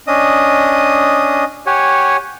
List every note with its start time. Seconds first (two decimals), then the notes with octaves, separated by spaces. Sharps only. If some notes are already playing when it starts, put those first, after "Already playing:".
0.07 C#4 D4 D#5 D#6
1.66 G4 C#5 F#5 G#5